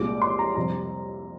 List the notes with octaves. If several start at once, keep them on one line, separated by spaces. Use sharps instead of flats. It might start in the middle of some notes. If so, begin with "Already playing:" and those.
Already playing: C2 A#2 G#3 D6
C6
A#5
F2 C3 G3 C4 A#5